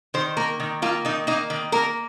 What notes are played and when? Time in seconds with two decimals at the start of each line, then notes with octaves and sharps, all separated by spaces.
0.14 D#3 C5
0.37 A#3 A#4
0.60 D#3
0.82 A#3 F4
1.05 D#3 D#4
1.27 A#3 D#4
1.50 D#3
1.72 A#3 A#4